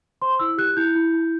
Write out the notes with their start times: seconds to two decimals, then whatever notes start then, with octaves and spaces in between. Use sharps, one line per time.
0.22 C5 C6
0.39 E4 E6
0.58 G4 F#6
0.77 E4 G6
0.95 E4
1.13 E4